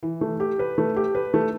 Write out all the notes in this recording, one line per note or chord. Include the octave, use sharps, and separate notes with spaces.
E3
A3
G4
B4
A3
G4
B4
A3